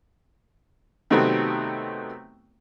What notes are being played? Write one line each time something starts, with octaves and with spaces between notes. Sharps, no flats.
C3 D#3 F#3 A3 B3 C4